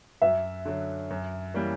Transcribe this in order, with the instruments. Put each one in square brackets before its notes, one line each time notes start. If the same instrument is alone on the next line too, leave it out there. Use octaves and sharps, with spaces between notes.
[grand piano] F#2 [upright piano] E5
[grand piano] D3 F#3
F#2
E3 G3 A#3 C#4